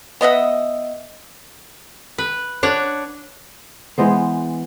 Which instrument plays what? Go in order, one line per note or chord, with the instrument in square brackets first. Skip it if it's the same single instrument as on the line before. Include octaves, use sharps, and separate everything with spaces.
[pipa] B3 D#5 E5 F#5
[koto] B4
D4 C#5 F#5
[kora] E3 G#3 B3 C5